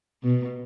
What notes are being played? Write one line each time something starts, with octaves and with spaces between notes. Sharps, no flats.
B2